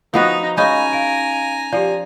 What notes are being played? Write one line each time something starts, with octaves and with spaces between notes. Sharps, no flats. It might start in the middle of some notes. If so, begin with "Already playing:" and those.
F3 B3 D#4 F#4 A#5
G#3 C#4 D#4 F5 G#5 A#5 B5
F5 D7
F3 G4 D5